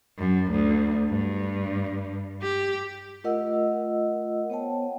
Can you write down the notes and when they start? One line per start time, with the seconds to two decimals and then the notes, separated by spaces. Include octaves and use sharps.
0.18 F#2
0.51 D2
1.09 G2
2.42 G4
3.24 A3 F4 A#4 D#5 F#5 E6
4.50 B3 C5 C#5 F#5 G5 A5